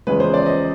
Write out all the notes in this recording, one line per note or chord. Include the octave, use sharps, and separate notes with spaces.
E2 C#3 F3 G#3 B4
C5
D5
D#5